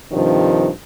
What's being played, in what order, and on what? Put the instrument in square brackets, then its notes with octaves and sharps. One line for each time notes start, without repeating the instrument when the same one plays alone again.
[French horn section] G2 C3 D#3 F3